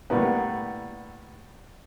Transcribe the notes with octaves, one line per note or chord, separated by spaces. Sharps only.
A2 D3 G3 A#3 B3